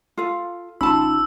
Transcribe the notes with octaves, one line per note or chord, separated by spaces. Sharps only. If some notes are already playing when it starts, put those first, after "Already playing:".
F4 A4 F5
G#1 C#4 D#4 F4 A5 B5 E6